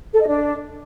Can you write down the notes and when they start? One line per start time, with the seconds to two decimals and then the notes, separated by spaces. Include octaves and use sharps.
0.13 A4
0.20 D#5
0.27 D4